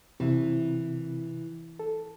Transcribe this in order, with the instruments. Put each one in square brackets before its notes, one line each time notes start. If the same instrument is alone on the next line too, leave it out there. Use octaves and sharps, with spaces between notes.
[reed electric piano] C3 E4 [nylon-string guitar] E3
[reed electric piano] A4